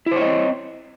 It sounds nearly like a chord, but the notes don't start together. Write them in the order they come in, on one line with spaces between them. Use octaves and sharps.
E4 C5 C#5 D#5 C4